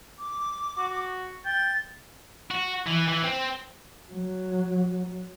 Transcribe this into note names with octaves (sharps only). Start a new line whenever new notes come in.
D6
F#4
G5 A6
F#4
E3
E3
C4
F#3